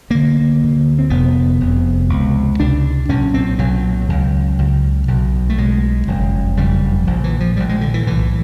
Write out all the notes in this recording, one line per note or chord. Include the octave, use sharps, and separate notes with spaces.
D2 D3 A#3
D2 D3
C4
F1 F2 C3 B3
F1 F2 C3
C#2 C3
C#2 C3 D4
B1 A#2 C#4
C4
B1 A#2 F#3
C#2 C#3
C#2 C#3
B1 B2
A3
B1 B2 G#3
F#1 F2 C#3
F#1 F2 C#3 G3
A#1 A#2 F3
E3
F3
A#1 A#2 G3
G#3
D3
E3
B1 A2 E3